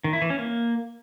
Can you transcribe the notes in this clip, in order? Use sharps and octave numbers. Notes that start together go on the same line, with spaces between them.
D#3
E4
E3
C#4
A#3